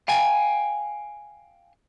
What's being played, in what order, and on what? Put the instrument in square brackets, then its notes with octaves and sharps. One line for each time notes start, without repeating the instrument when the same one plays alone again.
[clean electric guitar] F5 G5 G#5